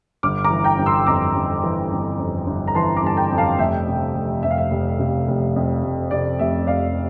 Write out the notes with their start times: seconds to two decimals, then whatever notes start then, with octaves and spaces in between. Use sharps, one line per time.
0.23 G1 D6 F6
0.44 A#5 D6
0.50 E3
0.64 G5 A#5
0.78 G1
0.86 C6 E6
1.06 F2 A#5 D6
1.34 G1
1.64 E3
1.91 G1
2.19 F2
2.47 G1
2.68 A#5
2.75 E3 A5 C6
2.96 A#5 D6
3.03 G1 A5
3.17 G5 A#5
3.32 F2
3.38 F5 A5
3.59 F1 E5 G5
3.87 C3
4.16 F1
4.43 F2 E5
4.51 F5
4.58 E5
4.71 F1
4.99 C3
5.28 F1
5.56 F2
5.84 F1
6.11 C3 D5
6.39 F1 E5
6.67 F2 D5 F5